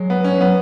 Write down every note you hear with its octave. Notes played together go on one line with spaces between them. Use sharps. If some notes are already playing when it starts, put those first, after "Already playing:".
Already playing: F#3 G#3
B3
C#4
F#3 B3